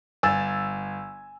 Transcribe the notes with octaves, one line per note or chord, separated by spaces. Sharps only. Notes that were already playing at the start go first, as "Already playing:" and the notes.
G1 G#5 E6 A6